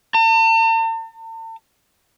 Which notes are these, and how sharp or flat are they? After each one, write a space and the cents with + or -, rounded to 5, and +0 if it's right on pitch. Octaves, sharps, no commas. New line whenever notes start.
A5 +45